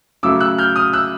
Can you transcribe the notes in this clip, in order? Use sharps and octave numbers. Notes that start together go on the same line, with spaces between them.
C#3 F#3 A3 D6 E6
E6 F#6
F6 G6
D#6 F6
E6 F#6